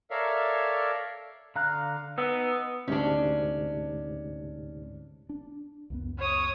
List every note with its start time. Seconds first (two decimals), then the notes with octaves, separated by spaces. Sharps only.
0.11 A4 A#4 C#5 D5 E5 F5
1.56 D3 F5 A#5 F#6
2.18 B3 D#4 E6
2.88 D2 G#2 C3 C#4 D4
5.29 D4
5.90 C#2 F#2 B3
6.19 C#5 D#6